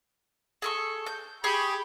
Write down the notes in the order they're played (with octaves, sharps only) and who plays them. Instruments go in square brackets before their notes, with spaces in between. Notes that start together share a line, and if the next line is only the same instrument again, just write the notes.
[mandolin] G#4 A4 C#6
G6
[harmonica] G4 B5 [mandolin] G#4 C#6